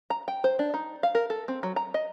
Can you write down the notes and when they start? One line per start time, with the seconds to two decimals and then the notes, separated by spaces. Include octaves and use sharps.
0.10 A#5
0.28 G5
0.44 C5
0.59 D4
0.74 D#4
1.03 F5
1.15 A#4
1.30 A4
1.48 C4
1.63 F#3
1.76 A#5
1.94 D#5